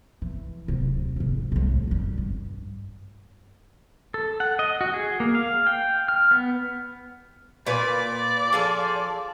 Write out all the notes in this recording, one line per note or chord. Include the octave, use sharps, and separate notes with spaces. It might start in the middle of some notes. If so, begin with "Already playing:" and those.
E3
D1 C3
F2 G#2
C2 A2
F#2 G3
G2
A4
F#5
D#5
F#4
G#4
A#3
F5
G5
F6
B3
A#2 B4 D5 G#5
F3 G#4 A4